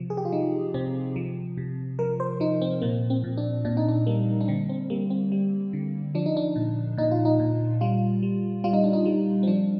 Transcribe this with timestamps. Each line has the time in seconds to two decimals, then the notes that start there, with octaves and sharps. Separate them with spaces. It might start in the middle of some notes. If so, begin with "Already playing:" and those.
Already playing: C3 F3
0.10 G#4
0.17 G4
0.25 F4
0.32 F3 D#4
0.74 C3 C4
1.16 F3
1.57 C3
1.99 F3 A#4
2.20 C5
2.40 F3 D#4
2.62 C4
2.82 A#2 A#3
3.10 C4
3.24 A#2
3.37 D4
3.65 A#2 D4
3.77 D#4
3.88 D4
4.07 G3 A#3
4.41 D4
4.48 D3 C4
4.69 C4
4.90 G3 A#3
5.10 C4
5.32 G3
5.73 D3
6.15 F3 D4
6.26 D#4
6.37 D4
6.56 A#2
6.98 A#2 D#4
7.11 F4
7.25 D#4
7.40 A#2
7.81 G3 F4
8.23 G3
8.64 G3 F4
8.73 D#4
8.84 D4
8.93 D#4
9.05 G3
9.43 C4
9.47 F3 D4